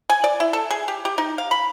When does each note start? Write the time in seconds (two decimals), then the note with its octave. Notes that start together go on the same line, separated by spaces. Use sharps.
0.10 G#5
0.24 D5
0.40 E4
0.53 A4
0.71 G#4
0.88 G4
1.05 G4
1.18 D#4
1.38 F5
1.51 B5